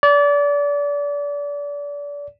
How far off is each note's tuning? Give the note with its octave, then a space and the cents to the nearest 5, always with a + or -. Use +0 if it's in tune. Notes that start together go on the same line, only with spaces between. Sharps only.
D5 -30